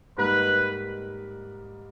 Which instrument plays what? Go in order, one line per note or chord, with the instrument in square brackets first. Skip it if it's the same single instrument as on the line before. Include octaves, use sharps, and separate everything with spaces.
[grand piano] G#2 G3 A#3 D#4 A#4 [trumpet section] B4